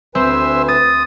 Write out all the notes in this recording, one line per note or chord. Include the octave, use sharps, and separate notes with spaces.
D2 C4 B4 C5 E5 G#5
D#6 A6